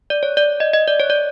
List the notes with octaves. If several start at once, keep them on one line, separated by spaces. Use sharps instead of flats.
D5
C#5
D5
D#5
D#5
D5
C#5
D5